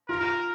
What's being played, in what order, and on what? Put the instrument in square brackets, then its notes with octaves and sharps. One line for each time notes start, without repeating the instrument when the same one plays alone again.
[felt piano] F4 [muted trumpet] A#4